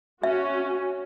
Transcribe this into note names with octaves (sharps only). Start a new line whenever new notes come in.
C#4 F#4 E5